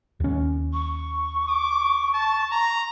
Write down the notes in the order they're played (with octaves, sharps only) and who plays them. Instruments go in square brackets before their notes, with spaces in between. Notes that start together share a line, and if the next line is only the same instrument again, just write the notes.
[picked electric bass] D#2 C#4
[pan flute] C#6
[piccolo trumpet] D6
A5
A#5